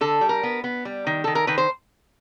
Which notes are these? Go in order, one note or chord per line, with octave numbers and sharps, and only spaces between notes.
D3 A4
G3
A#4
B3
B3
G3
D#3
D#3 A4
A#4
D#3 B4
C5